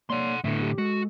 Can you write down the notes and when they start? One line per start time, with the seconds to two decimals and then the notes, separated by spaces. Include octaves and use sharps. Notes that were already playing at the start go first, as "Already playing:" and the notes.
0.10 A#3 C#5 D5 F#5 C6
0.45 A2 D3 B3 E4
0.62 G4
0.78 G#3 F#4 A4